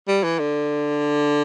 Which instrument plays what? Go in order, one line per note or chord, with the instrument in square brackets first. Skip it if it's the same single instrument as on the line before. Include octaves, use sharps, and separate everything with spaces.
[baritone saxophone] G3
E3
D3